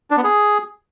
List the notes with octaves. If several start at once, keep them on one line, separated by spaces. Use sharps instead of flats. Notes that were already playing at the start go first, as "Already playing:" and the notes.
D4
B3
G#4